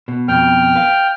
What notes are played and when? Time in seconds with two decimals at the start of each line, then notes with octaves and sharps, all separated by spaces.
0.08 B2
0.28 F2 B2 G5 F6
0.76 B4 F5